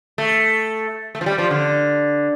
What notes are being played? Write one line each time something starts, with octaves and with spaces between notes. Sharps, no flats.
A3
A3
F3
G3
F3
D3